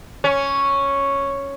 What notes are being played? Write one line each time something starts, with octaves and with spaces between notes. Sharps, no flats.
C#4